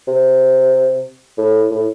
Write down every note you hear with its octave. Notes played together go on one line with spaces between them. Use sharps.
C3
A2
A2